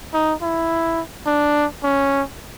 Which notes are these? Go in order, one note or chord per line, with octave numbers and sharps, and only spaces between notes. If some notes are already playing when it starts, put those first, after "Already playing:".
D#4
E4
D4
C#4